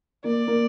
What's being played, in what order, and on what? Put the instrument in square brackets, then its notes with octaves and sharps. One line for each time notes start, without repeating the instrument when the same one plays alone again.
[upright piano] A#3 [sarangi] D5
[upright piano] A#3